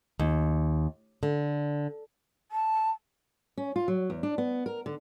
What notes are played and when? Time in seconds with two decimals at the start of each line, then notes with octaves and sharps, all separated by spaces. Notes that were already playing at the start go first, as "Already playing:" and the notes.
0.19 D#2
1.23 D3
2.51 A5
3.57 C#4
3.76 F4
3.88 F#3
4.10 E2
4.23 D4
4.38 B3
4.66 A#4
4.86 D3